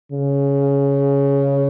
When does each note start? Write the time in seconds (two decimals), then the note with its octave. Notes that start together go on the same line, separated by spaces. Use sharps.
0.12 C#3